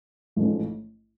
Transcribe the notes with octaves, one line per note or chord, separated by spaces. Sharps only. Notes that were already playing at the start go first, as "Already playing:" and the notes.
A1 G#2 F3 A3 C#4